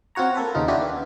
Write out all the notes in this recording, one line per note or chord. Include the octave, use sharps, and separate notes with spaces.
C4 F4 F#4 C#5 A#5
A#3 A4 B4
D#2 C#3 D#4 F4
D4 E4 F#4 G4 B4
B3